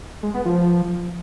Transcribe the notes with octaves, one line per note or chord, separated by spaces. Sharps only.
G#3
B3
F3